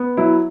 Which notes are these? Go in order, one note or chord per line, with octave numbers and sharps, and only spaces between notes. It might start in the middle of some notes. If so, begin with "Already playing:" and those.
Already playing: B3
F#3 E4